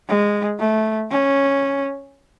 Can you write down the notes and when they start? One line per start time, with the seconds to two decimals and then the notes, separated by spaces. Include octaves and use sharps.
0.08 G#3
0.59 A3
1.10 C#4